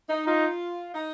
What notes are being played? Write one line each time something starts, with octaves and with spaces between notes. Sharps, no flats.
D#4
D#4 F4
D#4